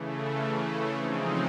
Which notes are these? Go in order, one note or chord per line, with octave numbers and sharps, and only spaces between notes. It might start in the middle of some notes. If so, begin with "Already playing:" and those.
Already playing: C#3 E3 A3
C#3 F3 G#3 C4 D#4